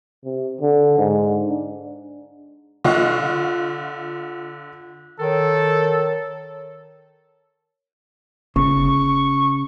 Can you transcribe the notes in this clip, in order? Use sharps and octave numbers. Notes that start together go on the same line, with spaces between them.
C3
D3
G#2
D4
D3 F4 D#5 F#5 C#6
D#3 A4 A#4 C#5
G1 C#3 C#6